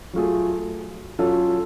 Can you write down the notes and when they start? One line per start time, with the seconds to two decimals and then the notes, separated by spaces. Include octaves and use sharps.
0.13 F#3 A3 F4 G#4
1.19 F#3 C#4 F4 A4